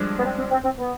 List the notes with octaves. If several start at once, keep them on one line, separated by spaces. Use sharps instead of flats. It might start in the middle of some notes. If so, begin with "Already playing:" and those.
Already playing: G2 F3 G#3 D4
B3
C4
C4
C4
C4
B3